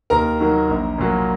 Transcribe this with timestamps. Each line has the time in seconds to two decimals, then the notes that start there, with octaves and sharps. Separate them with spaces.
0.10 D#2 A#4 A#5
0.40 D#3 F#3 A#3
0.69 A#1
0.98 A#2 F#3 A#3